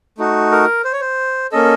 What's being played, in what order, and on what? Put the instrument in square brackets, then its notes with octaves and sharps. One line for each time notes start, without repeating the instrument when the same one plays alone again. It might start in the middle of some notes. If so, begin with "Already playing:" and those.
[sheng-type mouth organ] A3 D#4 F#4
A#4
C5
C#5
C5
A#3 C#4 A4 D#5